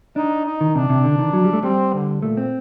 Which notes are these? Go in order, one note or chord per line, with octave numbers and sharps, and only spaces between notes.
D4 D#4
D#4
D#3
C3 D4
C3
D3
D#3
F#3
G3
A3
G3 C4
D3
A#2 A3
C4